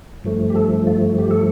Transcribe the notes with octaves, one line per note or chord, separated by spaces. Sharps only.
G2 F3 A3
G4
A4
F4
G4
A4